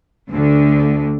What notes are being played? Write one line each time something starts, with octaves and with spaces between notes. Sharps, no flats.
D2 D3